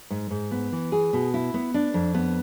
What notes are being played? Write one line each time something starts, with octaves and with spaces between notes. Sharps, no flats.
G#2
G#2
B3
E3
G#4
B2
E4
B3
D4
F2
B3